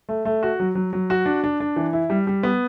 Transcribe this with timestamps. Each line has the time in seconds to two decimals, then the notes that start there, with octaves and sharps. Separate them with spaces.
0.09 A3
0.25 A3
0.43 F#4
0.60 F#3
0.75 F#3
0.93 F#3
1.10 F#4
1.26 D4
1.44 D4
1.60 D4
1.76 E3
1.93 E4
2.10 G3
2.27 G3
2.43 B3